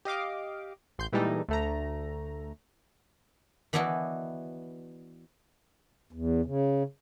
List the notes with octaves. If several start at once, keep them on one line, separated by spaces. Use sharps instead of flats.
G4 D#5 F5 D6
A1 C6 G6
A#2 E3 G3 G#3 D#4 A4
D2 A3 A#5
E3 B3 D4 E4 F#4 D#5
E2
C#3